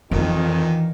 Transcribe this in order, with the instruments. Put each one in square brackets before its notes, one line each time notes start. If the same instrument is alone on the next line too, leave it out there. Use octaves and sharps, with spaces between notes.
[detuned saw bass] F2 [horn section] A#2 D#3 [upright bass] E3